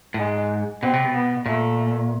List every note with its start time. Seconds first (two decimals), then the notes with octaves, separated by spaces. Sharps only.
0.14 A2
0.18 G#2 G#3
0.82 B2 C4
0.93 C3
1.04 B2
1.15 B3
1.46 A#2 A3